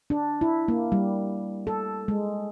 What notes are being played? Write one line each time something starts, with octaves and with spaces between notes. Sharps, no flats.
D4
E4
A#3
G3
A4
G#3